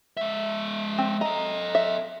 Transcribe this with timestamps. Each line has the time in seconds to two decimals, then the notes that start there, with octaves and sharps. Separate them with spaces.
0.17 G#3 E5
0.98 C4
1.21 A4 D#5 A#5
1.75 E5